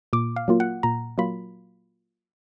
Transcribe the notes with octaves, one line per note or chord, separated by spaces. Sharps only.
A#2 D6
F5
F#3 A#3 F4
F#5
A#2 A#5
F#3 A#3 F4 B5